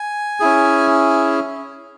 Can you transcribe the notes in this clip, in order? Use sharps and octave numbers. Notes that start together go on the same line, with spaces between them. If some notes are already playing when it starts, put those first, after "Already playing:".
Already playing: G#5
C#4 E4 G#4